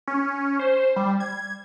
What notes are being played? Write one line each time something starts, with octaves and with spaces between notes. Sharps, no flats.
C#4
C5
G3
G#6